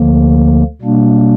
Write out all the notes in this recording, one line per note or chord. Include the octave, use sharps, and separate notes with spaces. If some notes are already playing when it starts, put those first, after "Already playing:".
Already playing: D2 D3 F3 A#3
B2 G3 A#3 D4